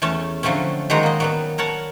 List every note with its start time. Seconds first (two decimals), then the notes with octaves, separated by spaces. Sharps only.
0.02 E2 A3 C#4 A5
0.43 D3 F3 F#3 A3 C4 C#4
0.90 D#3 F#3 G#3 F#4 C5 A#5
1.03 A#3 D#5
1.20 F#3 G3 B3
1.58 A#4 C#5 F#5 A5